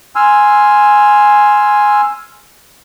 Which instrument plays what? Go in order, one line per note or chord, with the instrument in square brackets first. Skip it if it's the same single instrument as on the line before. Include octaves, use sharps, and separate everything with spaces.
[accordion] G#5 C6 E6 F6